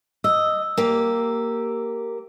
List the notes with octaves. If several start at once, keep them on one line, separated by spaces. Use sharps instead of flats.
D#5 E6
A#3 G4